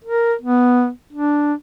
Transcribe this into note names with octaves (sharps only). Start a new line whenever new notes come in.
A#4
B3
D4